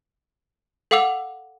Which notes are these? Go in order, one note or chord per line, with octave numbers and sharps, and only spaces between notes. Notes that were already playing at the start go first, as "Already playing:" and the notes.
A4 F5 F#5 D6 E6 F7